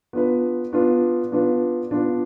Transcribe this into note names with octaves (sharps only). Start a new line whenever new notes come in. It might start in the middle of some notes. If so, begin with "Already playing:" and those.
B3 D4 F4 B4
B3 D4 F4 B4
B3 D4 F4 B4
B3 D4 F4 B4